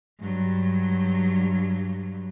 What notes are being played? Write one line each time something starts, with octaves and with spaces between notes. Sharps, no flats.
G2 F#3